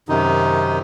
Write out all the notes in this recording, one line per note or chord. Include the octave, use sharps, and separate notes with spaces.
F#2 C3 D#3 D#4